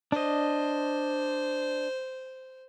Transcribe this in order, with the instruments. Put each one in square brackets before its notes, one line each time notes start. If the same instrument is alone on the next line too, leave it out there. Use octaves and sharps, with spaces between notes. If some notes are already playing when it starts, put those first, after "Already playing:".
[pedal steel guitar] D4 D#5 [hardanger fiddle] C5